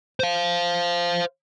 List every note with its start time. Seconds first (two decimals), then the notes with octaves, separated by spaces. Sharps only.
0.20 C5 F5